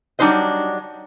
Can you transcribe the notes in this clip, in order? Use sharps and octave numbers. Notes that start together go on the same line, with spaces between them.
F#3 G3 D4 D#4 C5 D#5